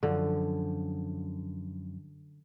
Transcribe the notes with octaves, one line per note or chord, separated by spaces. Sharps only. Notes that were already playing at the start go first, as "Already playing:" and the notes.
F#2 D3 F3